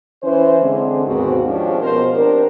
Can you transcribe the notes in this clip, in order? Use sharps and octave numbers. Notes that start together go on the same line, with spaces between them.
E3 C#4 C5
D3 G#3 C4
D#2 G#2 B2 C4 F#4
F3 G#3 C#4 D4 G4
B2 F3 A#4 C5
C4 D4 G4 A#4